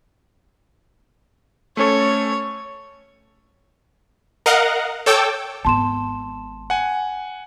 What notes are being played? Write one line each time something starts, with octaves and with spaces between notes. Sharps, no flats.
A3 C#4 A4 C#5
A#4 D#5 F5 F#5
A4 C#5 G5 D6 E6
G#1 B3 A5 C6 E7
F#5 G#5